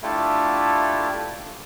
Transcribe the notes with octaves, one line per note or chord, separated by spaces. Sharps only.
A3 D4 E4 F4 G4 A4